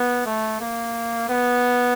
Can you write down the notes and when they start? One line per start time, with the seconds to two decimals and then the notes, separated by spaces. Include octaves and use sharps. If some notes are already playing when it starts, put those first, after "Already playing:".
Already playing: B3
0.26 A3
0.61 A#3
1.29 B3